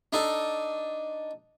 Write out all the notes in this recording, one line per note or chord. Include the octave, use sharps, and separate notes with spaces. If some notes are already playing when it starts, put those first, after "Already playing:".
D4 D#4 A4